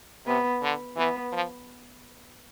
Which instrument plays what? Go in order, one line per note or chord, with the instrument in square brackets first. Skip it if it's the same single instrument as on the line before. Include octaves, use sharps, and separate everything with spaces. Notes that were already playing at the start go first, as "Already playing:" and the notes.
[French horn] C3 [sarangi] B3
[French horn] D3
[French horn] E3 [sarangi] B3
[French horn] F3